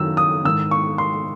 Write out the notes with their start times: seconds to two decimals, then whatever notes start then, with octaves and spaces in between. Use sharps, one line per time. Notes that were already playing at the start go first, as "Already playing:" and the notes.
Already playing: F#2 D#3 E6
0.17 D#6
0.45 G#2 D#3 E6
0.71 C#6
0.98 C6